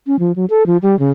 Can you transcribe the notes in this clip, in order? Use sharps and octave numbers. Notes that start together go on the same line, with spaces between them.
C#4
F3
F#3
A4
F3
G3
C#3